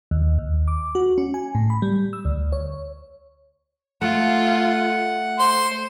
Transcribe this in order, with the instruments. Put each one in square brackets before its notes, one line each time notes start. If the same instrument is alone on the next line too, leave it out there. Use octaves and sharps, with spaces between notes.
[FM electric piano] D#2
D#2
D6
F#4
C#4
G#5
A2
B5
G3
E6
D2
C#5
[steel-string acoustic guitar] A3 [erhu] F4 [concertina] F#5
[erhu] C5 [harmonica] C6